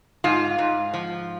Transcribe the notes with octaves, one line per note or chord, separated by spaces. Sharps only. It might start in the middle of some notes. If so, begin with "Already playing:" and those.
G#2 F4
G#2
F3